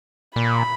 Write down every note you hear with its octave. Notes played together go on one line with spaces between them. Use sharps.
A#2 B5